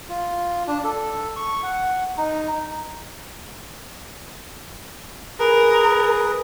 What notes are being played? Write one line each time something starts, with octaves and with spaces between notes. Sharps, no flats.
F4
D4
A4
C#6
F#5
D#4
G#4 A#4 B4